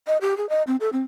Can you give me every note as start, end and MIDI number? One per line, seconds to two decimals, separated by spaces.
0.07 0.17 75
0.21 0.36 67
0.37 0.48 68
0.49 0.63 75
0.67 0.76 60
0.80 0.90 69
0.93 1.02 60